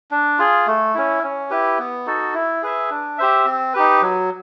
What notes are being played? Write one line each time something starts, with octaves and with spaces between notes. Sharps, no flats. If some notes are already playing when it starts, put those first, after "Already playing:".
D4
F4 G#4
A3
C#4 E4
C#4
E4 G4 B4
B3
D#4 F#4 A4
E4
G#4 B4 E5
D4
G4 C5 E5
C4
D#4 G4 B4
F#3